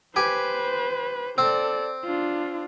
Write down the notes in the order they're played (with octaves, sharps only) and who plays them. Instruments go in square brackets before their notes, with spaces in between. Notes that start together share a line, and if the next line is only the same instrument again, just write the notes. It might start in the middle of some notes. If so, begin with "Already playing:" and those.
[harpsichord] G4 G#5 [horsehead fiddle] B4 C5
[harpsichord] C4 [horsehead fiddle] A4 D5
[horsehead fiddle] D4 F4